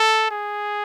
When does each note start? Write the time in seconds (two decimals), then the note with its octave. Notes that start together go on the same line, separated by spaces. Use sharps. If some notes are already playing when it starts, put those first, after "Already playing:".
Already playing: A4
0.31 G#4